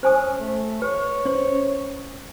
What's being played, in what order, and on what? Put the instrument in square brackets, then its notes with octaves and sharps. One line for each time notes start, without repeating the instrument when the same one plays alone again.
[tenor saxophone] C#4 [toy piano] C5 G#5 D#6
[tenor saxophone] A3
[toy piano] B4 [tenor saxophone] C#5
[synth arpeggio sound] C#4 C5